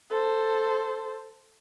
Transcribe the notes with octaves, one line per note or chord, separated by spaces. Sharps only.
A4 C5